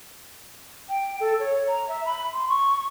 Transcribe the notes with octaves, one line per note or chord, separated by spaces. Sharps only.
G5
A4
C#5
A#5
E5
B5
C6
C#6